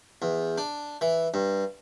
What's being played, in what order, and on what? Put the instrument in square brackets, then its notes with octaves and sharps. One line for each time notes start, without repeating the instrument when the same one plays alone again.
[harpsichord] E2
D4
E3
G2